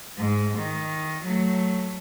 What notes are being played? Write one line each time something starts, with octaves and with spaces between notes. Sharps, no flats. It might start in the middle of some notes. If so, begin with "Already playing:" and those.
G#2
D#3
F#3 A3